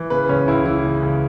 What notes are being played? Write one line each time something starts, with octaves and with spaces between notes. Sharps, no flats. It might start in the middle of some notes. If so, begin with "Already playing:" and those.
Already playing: E3
C#3 B4
C#2 C#4
C#2 E4
E3 E4
C#3
C#2